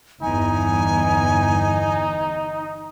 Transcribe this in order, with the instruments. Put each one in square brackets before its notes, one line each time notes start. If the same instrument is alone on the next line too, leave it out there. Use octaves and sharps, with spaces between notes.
[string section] G1 E2 E3 [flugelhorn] D#4 [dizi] G#5